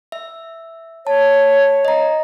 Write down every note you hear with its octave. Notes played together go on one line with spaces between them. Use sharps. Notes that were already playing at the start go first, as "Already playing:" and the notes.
E5
C#5 A5
D#5 A#5